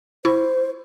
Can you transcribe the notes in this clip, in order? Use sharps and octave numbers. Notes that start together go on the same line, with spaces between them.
E4 C5 C#6